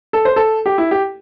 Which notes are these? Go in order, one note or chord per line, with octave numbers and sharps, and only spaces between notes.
A4
C5
A4
G4
E4
G4